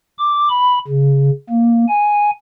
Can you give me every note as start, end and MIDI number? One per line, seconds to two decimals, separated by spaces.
0.18 0.49 86
0.49 0.79 83
0.87 1.30 49
1.49 1.85 58
1.88 2.30 80